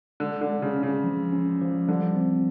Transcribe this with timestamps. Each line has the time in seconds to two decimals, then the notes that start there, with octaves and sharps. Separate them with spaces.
0.20 D3 G#3
0.41 D3
0.49 G#3
0.62 C#3
0.76 C#4
0.83 C#3
1.04 F3
1.33 C#4
1.61 F3
1.88 D3 G3
2.16 C4